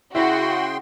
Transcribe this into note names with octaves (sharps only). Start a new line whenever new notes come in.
C#3 E4 F#4 G5 C6